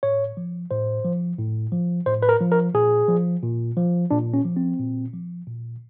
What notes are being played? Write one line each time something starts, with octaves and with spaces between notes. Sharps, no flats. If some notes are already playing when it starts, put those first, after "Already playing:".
A2 C#5
F3
A2 C5
F3
A2
F3
A2 C5
B4
A#4
F3
A#4
A#2 G#4
F3
A#2
F3
A#2 D4
C#4
F3
C4
A#2
F3
A#2